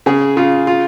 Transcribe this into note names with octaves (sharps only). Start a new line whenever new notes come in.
C#3 G#4
C#3 F4
F4